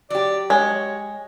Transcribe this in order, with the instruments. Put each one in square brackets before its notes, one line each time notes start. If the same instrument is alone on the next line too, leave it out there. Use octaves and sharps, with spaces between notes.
[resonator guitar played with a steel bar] F#3 G4 [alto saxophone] D5
[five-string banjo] G#3 [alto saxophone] C#5